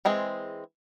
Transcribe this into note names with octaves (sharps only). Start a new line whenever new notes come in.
E3 G#3 C4 G#4